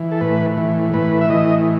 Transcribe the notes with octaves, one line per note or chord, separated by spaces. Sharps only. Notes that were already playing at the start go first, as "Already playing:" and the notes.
Already playing: E3
A4
A2 B4
E3
A2 B4
E5
E3 D#5